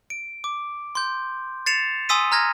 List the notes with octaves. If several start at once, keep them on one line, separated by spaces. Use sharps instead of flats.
D7
D6
C6 G6
A6 C7 C#7 E7 F7
G#5 C6 D#6 E6 B6 D#7
A#5 F6 G#6 A#6